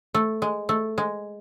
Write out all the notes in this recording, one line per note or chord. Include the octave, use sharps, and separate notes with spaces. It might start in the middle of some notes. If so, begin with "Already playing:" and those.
A3
G#3
A3
G#3